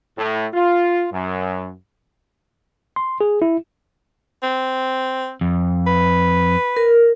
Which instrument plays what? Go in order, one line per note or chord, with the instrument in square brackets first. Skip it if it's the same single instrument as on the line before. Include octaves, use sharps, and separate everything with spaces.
[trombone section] A2
F4
F#2
[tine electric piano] C6
G#4
E4
[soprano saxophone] C4
[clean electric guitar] F2
[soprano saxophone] B4
[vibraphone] A#4